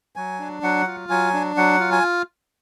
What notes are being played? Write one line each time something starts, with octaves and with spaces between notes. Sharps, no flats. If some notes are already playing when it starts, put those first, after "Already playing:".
F#3 G#5
D4
F#3 F#5
F4
F#3 G#5
D4
F#3 F#5
F4
G#5